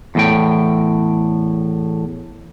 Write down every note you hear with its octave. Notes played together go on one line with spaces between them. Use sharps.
E2 A2 G5